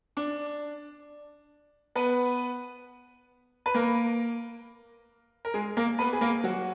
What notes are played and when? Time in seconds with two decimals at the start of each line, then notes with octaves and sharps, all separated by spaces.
0.17 D4 D5
1.95 B3 B4
3.66 B4
3.75 A#3 A#4
5.45 A#4
5.54 G#3 G#4
5.77 A#3 A#4
5.99 B3 B4
6.13 G#4
6.21 A#3 A#4
6.44 F#3 F#4